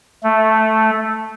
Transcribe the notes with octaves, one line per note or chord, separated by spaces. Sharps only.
A3